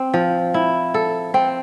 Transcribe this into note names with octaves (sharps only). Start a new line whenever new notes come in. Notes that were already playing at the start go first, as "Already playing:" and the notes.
Already playing: C4
F3
E4
A4
C4